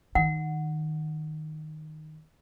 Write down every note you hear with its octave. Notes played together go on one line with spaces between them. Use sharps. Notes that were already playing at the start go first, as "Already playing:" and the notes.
D#3 F#5